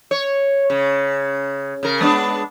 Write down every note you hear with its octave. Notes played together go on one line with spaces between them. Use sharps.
C#5
C#3
C#3 A#4
G#3 B3 D4